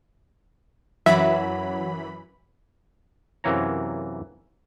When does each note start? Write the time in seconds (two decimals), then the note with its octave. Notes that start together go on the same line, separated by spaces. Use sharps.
1.06 F#2 E3 F#3 E5 B5
3.44 F#2 C3 E3 A#3 C#5 A#5